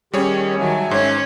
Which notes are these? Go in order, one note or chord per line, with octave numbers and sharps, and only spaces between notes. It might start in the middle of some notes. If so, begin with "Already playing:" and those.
D#3 G3 C#4 G4 G#4 C#5
D#3 F#3 E5 G#5 A5
G#2 D#3 C#4 C#5